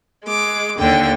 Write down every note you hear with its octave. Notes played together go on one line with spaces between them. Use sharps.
G#3 D6
D#2 D3 G5